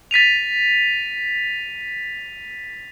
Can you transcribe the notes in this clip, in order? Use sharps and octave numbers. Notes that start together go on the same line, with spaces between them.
A6 B6 D#7 F7